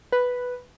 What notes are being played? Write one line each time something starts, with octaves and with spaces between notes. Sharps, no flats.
B4